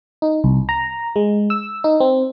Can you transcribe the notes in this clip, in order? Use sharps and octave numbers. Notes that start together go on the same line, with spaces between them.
D#4
C2
A#5
G#3
E6
D#4
C4